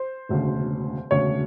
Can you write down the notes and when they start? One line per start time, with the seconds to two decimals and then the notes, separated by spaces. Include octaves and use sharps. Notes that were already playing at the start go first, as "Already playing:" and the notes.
Already playing: C5
0.29 E1 D2 C#3
1.11 E1 D2 C#3 C#5